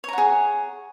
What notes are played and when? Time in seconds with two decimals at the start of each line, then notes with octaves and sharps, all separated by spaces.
0.04 C#5
0.08 A#5
0.13 F#5
0.18 G#4